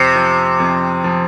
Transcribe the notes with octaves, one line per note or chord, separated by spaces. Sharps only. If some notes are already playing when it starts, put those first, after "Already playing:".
Already playing: F2 C3
F3
F2
F3